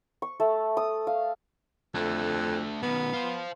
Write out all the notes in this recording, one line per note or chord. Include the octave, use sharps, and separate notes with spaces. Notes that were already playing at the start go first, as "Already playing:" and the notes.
C#6
A3
D#6
F5
F2 A3 D4
B2 D#3 B3
F4 C5